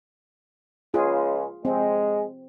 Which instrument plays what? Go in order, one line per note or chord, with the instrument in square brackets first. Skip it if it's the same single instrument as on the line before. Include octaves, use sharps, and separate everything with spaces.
[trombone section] C#2 C#3 G#3 [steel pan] F4 G#4
[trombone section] G#3 [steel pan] C4